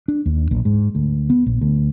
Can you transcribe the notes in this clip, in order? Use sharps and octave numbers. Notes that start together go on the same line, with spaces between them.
D4
D#2
A#1
G#2
D2
B3
A#1
D2